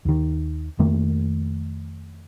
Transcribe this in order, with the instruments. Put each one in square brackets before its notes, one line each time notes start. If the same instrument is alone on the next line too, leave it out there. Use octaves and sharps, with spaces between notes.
[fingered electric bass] D#2 D#3
F2 D#3 A3 A#3